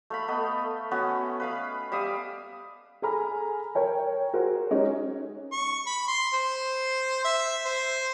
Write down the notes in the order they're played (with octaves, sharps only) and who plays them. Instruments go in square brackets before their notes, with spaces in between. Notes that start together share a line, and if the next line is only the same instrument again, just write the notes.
[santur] A3 F5 B5
A3 B3 D#5
B3 C#4 F#4
B4 F5 B5
G3 E5 F5 D#6
[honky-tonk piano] G#4 A4 G#5 A#5 B5 F6
A#4 C#5 G5
F#4 G#4 A#4 C5
G#3 C#4 D#4
[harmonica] C#6
B5
C6
C5
E5
C5